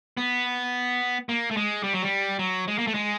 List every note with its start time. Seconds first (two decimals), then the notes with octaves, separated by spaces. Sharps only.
0.17 B3
1.29 A#3
1.51 A3
1.57 G#3
1.83 G3
1.94 F#3
2.02 G3
2.39 F#3
2.68 G#3
2.79 A#3
2.87 A3
2.94 G#3